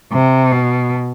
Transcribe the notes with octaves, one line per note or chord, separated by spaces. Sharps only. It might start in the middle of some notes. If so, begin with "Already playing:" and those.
C3
B2